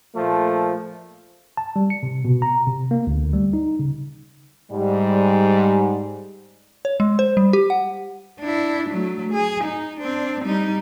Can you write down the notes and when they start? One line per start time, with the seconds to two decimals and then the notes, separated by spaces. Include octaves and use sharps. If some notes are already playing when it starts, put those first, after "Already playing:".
0.15 A#2 F3 A3
1.57 A5
1.76 G3
1.90 C#7
2.03 C3
2.25 B2
2.42 A#5
2.67 C3
2.91 A#3
3.07 D2
3.33 G3
3.53 D#4
3.79 C#3
4.70 G#2 G3
6.85 C#5
7.00 G#3
7.19 C5
7.37 G3
7.53 G4
7.70 F#5
8.41 D4 E4
8.90 F#3 A3
9.32 G#4
9.64 D#4
10.00 C4 D4
10.44 G3 D#4